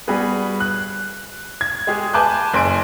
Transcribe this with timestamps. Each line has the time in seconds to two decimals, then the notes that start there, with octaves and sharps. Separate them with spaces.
0.08 G3 B3 F#4 G#4 B4
0.60 F#6
1.61 G#6
1.87 G#3 G4 G#4
2.14 B4 G#5 A5 D6 F#6 G6
2.53 F#1 G#5 C6 D7